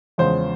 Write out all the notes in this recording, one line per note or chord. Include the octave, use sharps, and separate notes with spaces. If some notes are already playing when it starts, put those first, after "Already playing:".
E2 C#3 F3 G#3 C5